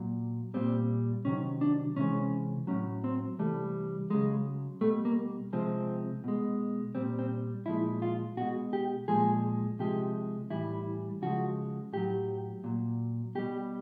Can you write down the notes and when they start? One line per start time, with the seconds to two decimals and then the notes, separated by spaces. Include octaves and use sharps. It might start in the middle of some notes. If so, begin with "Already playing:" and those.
Already playing: A#2 F#3
0.54 A#2 G3 C4
1.25 C3 D#3 F#3 C#4
1.61 D4
1.96 C3 E3 G#3 C#4
2.67 A2 F#3 C#4
3.04 C4
3.39 C3 E3 G3 A3
4.10 C#3 F#3 G#3
4.81 B2 G3 A3
5.05 A#3
5.53 C3 F3 G#3 C4
6.24 B2 G#3
6.95 A#2 G3 C4
7.19 C4
7.66 A#2 F3 G#3 E4
8.02 F4
8.37 B2 G#3 F#4
8.73 G4
9.08 A#2 F3 G#3 G#4
9.79 C3 F3 G#3 G4
10.50 A2 E3 G3 E4
11.22 C#3 F3 G#3 F#4
11.93 A2 F#3 G4
12.64 A#2 F#3
13.35 B2 G3 G4